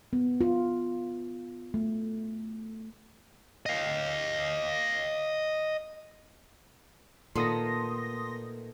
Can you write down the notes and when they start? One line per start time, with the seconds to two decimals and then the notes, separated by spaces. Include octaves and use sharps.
0.13 B3
0.41 F4
1.74 A3
3.66 D#5 F5
7.35 A#2 D#3 A3 B3 C6 D#6 A#6